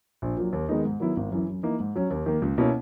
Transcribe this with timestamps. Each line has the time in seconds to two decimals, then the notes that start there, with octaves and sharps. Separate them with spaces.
0.22 A#1
0.37 A#2 F#3
0.53 D#2
0.69 D#3 G#3 B3 D#4
0.85 G#2
1.00 D#3 F#3 B3 E4
1.17 G#1
1.31 F#2 E3
1.48 F#2
1.63 E3 A#3 D#4
1.80 G#2
1.96 F#3 C#4
2.11 D#2
2.26 D#3 A#3
2.42 C#2
2.58 B2 A#3 C#4 E4